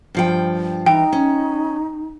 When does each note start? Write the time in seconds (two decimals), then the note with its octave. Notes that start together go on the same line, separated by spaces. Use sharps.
0.15 G2 F3 G5
0.86 E3 D#4 G5
1.13 C#4